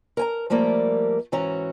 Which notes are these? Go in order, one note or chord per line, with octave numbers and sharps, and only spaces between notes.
A#4 G#5 A#5
F3 G3 A3 A#3 A#4 D5
G#2 E3 C#4 F#4 A#5